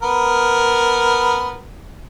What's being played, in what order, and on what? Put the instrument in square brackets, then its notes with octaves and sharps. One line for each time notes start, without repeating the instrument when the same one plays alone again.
[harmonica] B3 A#4